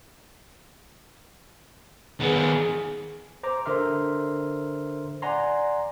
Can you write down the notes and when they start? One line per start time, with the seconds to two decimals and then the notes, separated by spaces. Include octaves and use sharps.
2.20 D#3 B3 G#4
3.43 C5 A#5 D6
3.66 D3 A#4 C5 E5 C6 F6
5.22 D5 F#5 G#5 A#5 C6